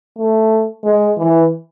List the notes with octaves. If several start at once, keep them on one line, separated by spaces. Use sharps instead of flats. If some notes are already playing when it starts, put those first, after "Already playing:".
A3
G#3
E3